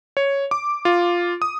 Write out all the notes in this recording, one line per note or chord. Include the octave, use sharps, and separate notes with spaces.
C#5
D6
F4
D#6